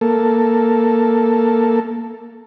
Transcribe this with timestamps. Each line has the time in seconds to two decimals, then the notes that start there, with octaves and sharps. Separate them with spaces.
0.01 A#3 A4